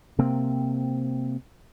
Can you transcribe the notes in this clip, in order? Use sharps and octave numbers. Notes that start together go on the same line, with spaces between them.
C3 A#3 C4